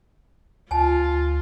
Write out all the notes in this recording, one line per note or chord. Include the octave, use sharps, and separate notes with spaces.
D2 F4 G#5 A5